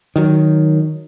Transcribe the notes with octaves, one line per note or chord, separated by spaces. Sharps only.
D#3 F#3